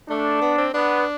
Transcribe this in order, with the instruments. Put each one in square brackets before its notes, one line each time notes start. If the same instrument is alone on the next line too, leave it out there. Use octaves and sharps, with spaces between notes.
[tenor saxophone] A3 [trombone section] D4
[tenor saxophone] B3
C4
[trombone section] B3 [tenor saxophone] D4